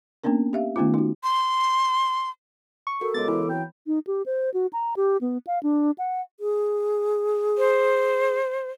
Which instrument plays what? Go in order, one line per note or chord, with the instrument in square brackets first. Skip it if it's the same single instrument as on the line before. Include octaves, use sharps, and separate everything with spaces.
[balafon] A#3 B3 C#4 D4 A#4
G4 E5 F5
D#3 A3 B3 C#4 D#4 F4
D#4 F#4
[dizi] C6
[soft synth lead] C#6
[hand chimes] F#4 A#4 [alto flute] A4
[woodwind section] C#2 G#3 D6 [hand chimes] B3 C#5 [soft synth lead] A6
[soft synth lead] E3 [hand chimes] B5
[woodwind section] F#3 C4 G5
[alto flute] D#4
G4
C5
F#4
A#5
G4
B3
F5
D4
F#5
[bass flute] G#4
[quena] C5